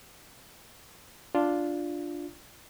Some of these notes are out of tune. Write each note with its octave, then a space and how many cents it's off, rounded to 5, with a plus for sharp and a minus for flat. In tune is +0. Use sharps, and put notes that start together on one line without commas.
D4 +0 F4 +0